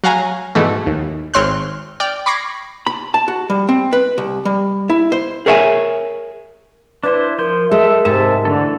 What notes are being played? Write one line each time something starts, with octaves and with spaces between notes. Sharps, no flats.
F#3 F5 F#5 G#5 A#5
G#2 B2 E3 A3
D#2
G#1 C4 C#5 C6 F6 F#6
D5 G5 F6
B5 C#6 D6 G#6 A#6 C7
B5
A5
F#4
G3
C4
B4
C2
G3
E4
C5
G#4 A#4 C#5 E5 F5 G#5
D4 E4 B4 C5
F3 A#4 C6 G6
G#3 A4 E5
G#2 C3 E5 A5
D3 E3 A3 A4